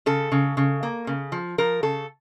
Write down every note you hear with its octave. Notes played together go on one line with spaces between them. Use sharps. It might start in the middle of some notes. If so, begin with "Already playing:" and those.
C#3 A4
C#3
C#3
A#3
C#3
F3
F3 A#4
C#3 A4